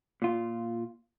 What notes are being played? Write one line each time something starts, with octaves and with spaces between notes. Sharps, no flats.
A#2 F4